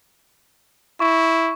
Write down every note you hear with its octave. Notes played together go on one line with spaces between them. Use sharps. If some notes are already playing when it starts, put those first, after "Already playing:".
E4 C#6